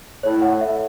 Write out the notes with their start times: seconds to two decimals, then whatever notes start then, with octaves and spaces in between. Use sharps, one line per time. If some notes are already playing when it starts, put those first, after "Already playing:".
0.23 A2 C#5
0.42 F#5
0.61 E5